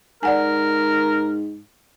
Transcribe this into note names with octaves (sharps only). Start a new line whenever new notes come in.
G#2 A#4 D5 F#5 G#5